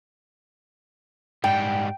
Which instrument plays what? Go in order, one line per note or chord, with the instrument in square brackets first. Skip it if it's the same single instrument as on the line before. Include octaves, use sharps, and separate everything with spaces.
[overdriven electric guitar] G#2 G3 [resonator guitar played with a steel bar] G5